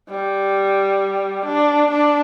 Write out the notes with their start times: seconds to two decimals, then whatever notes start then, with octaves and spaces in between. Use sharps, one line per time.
0.09 G3
1.46 D4
1.91 D4